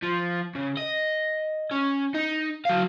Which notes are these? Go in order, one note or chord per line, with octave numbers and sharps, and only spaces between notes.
F3
C#3
D#5
C#4
D#4
F#3 F5